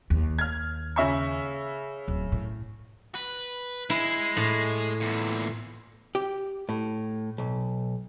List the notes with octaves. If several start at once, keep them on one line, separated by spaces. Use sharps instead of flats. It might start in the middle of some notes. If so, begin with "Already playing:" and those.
D#2
F6 G#6
C#3 E5 C#6
D1
A2
B4
G#3 E4
A2
E2 A#2
G4
A2
B1